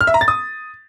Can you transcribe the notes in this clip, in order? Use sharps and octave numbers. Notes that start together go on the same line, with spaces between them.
F6
E5
A#5
A6
D#6